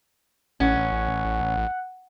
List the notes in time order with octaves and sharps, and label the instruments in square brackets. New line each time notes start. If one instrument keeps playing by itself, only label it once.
[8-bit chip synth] A1 [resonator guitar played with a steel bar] C#4 [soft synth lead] F#5